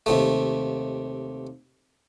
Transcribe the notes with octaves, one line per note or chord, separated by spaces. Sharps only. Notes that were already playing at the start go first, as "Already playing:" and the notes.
D#2 C3 A3